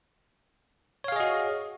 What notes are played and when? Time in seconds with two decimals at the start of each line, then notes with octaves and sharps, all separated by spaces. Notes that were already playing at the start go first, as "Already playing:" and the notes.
1.04 C#5
1.08 F5
1.12 G#4
1.16 D#5
1.20 F#4